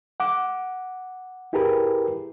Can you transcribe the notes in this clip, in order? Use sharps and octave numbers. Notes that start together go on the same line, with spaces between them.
F#5 D6
E4 G4 G#4 A#4 B4